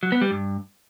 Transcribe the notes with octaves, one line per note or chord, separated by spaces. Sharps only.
F#3
B3
G3
G2